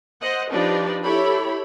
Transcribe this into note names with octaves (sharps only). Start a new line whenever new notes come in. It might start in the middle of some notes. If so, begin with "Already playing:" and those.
C5 D#5 F#5
F3 D4 D#4 G4 B4 D5
E4 G4 A4 C#5 B5